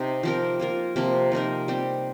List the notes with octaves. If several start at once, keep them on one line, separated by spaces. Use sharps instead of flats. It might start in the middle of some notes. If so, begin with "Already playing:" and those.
Already playing: C3 D#4
F3 C4 G4 A#4
A#3 F4 A#4
C3 F3 A#3
F3 C4 D#4 A#4
G3 C4 G4